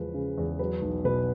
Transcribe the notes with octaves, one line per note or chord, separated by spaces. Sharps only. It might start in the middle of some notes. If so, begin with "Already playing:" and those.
Already playing: E2 C#3 F3 G#3 B4
C#3
E2
F#3 B4
B1
B2 B4